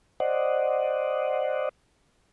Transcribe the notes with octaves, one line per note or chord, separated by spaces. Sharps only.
C5 D5 D#5 F#5